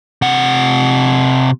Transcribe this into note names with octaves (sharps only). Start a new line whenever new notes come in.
C3 F#5